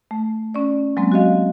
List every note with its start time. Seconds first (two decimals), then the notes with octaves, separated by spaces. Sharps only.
0.11 A3
0.54 C#4 D5
0.97 F#3 G#3 A#3 C4
1.12 F#4 G4 D#5 F5